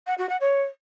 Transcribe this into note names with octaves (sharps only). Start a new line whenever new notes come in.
F#5
F#4
F#5
C#5